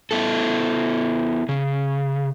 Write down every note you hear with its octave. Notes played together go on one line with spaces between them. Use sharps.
B3 E4 A4
C#3